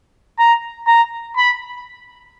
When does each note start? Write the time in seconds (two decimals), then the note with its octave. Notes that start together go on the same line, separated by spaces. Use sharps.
0.39 A#5
0.87 A#5
1.36 B5